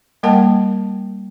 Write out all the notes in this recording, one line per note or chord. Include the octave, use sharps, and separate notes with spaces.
G3 A#3 A#4 F#5 G5 A5